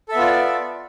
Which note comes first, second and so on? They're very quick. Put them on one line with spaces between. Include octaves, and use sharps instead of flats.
A4 E5 B3 F4 D5